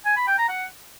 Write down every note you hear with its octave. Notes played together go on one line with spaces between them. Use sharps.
G#5
B5
G5
A#5
F#5